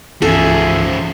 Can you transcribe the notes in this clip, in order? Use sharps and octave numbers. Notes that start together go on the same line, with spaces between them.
C2 G2 C#3 E3 F3 G#4 A4 E5